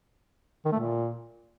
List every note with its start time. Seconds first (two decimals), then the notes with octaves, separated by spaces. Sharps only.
0.65 D#3
0.72 A3
0.79 A#2